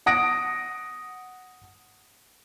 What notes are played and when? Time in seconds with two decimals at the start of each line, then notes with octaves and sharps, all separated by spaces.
0.06 F#5 D#6 A#6 D7